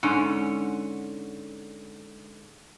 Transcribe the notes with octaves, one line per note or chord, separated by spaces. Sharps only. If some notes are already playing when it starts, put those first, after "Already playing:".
G#2 D3 C#4